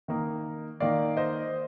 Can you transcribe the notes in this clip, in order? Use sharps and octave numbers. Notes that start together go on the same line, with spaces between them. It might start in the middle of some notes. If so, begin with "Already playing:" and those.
D#3 A#3 D#4
D#3 A#3 D#4 D5 F5
C5 D#5